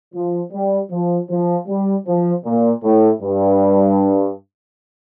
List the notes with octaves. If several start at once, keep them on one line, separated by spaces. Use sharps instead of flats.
F3
G3
F3
F3
G3
F3
A#2
A2
G2